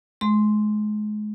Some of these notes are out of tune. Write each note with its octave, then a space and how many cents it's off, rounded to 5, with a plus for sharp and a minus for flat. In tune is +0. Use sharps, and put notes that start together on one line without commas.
G#3 +30 C6 +0